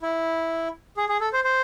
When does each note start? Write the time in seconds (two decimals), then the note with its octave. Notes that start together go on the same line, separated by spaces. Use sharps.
0.02 E4
0.97 G#4
1.09 G#4
1.21 A4
1.33 C5
1.44 C5